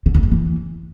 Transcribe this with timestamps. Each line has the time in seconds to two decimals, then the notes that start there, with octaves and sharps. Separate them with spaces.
0.06 D3
0.14 E2
0.23 F#2
0.31 E3